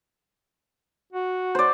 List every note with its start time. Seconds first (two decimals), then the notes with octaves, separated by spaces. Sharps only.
1.13 F#4
1.55 C5 D5